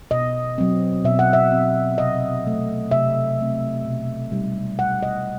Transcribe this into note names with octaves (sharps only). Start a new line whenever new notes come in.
B2 D#5
F#3 C4
B2 E5
F#5
E5
F#3 C4
C3 D#5
F#3 A3 C4
C3 E5
F#3 A3 C4
B2
G3 D#4
B2 F#5
D#5